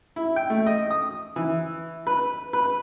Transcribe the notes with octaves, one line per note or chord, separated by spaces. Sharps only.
E4
G5
A3
D#5
D#6
E3
B4
B4